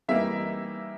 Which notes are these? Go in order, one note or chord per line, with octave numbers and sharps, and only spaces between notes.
E3 G3 A#3 D#4 E5